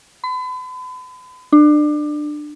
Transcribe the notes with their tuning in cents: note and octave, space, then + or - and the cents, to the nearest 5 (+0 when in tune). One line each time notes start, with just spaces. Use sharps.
B5 +40
D4 +25